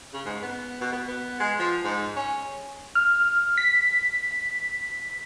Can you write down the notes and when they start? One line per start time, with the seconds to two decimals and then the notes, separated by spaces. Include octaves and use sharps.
0.13 C#3
0.26 G#2
0.42 B3
0.81 B2
0.93 B3
1.08 B3
1.40 G#3
1.59 F3
1.84 G#2
2.16 C#4
2.95 F6
3.58 B6